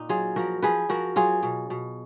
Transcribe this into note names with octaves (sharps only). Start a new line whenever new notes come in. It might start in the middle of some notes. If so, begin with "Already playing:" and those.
Already playing: A#2 D#4
F#3 F4 G#4
F3 F#4 A#4
F3 G#4 B4
F3 F#4 A#4
F#3 F4 G#4
B2
B2